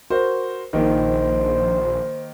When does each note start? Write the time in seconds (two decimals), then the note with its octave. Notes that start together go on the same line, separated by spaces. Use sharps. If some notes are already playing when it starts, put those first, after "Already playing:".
0.10 F#4 A#4 C5
0.73 A#1 D#3 A#3 C5